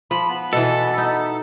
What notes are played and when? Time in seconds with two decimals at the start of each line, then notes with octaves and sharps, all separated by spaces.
0.11 F3 B5
0.29 B3
0.53 B2 E3 A4
0.98 D#4